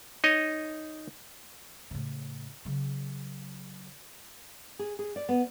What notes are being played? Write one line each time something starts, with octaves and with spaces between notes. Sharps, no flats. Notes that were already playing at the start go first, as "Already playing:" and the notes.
D#4 C#5 D#5
A2 C#3
C#3 F#3
G#4
G#4
D5
B3